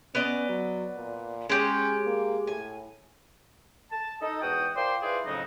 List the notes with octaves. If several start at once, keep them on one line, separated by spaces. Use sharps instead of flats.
B3 C#4 D5 D#5
F#3
A#2
G#3 C#4 G4
A#3
A2 G#5
A5
D#4 A4 D#5
E2 G#2 F#4 G5 D#6
F4 A#4 C5 D5 G5 C6
E4 F4 G#4 B4 C5 D5
F2 A2 C#3 F#3 D#4